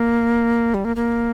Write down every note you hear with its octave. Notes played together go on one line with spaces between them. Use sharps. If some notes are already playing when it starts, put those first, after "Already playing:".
Already playing: A#3
G3
A#3
A#3